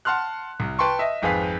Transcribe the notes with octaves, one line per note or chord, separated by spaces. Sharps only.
F#5 A5 C6 F6 F#6
C2
B4 G5 A5 C6 C#6
D#5 E5
G#1 F2 G#4 B4 F5 B6